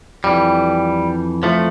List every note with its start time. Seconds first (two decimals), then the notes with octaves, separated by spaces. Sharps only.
0.24 F2 E3 G3
1.43 F3 A3